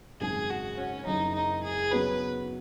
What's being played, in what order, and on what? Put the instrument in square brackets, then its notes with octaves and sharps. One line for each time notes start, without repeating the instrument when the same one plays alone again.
[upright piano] G#1 F#2 C#3 G#3 [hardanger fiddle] G#4
[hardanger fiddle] F#4
C#4
[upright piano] F#1 F#2 C#3 [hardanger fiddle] D#4
[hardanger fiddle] D#4
G#4
[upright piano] C#3 F#3 B3 F#4 C#5 [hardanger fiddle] B4